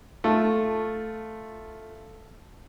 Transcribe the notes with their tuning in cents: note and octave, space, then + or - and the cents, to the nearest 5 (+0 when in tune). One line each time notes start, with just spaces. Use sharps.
A3 +0 F4 +0